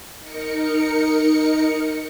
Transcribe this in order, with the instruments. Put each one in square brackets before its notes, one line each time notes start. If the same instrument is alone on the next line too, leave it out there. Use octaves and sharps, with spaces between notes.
[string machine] D#4 A#4 C#7